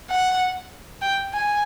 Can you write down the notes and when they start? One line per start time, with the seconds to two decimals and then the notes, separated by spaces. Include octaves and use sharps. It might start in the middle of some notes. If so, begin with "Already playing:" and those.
0.10 F#5
1.02 G5
1.33 G#5